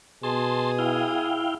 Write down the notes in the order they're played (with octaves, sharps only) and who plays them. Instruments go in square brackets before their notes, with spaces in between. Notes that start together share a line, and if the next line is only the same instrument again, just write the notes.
[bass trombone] B2 [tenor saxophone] G#4 [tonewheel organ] A5 C6
[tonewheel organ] E4 F5 G5